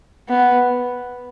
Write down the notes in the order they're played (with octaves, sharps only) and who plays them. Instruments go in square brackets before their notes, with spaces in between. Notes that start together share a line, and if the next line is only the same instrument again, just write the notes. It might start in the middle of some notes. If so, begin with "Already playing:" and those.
[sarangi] B3